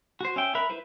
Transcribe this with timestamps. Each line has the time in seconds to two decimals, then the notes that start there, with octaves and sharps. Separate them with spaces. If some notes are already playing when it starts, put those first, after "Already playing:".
0.21 F#4 C5
0.36 C#4 E5 G5
0.55 A#4 E5 B5 F#6
0.69 E4 B4 C5 E5